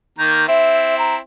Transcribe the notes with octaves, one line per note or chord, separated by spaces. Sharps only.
D#3 A#3 A#5 G6
C4 E4 E5
A#5